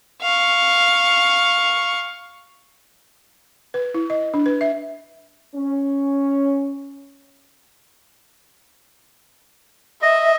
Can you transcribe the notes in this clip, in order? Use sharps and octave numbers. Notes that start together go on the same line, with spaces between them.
F5 C#6
B4
E4
D#5
D4
B4
E5
C#4
D#5 E5